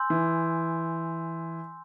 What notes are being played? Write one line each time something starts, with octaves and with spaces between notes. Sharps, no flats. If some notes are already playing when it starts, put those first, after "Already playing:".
Already playing: G#5 C6 E6 G6
E3